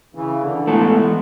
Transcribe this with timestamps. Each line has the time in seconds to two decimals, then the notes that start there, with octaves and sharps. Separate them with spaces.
0.15 C#3 E3
0.41 D3
0.67 E3 G#3 A3 B3 E4 A4